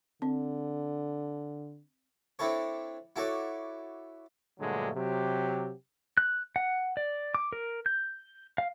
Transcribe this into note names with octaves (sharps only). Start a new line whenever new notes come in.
D3 C4
C4 D4 E4 A4 C#5
E4 F#4 A4 C#5 D5
G2 A#2 D3 F#3 G#3 A3
C3 F#3 G4
F#6
F#5
D5
D6
A#4
G6
F5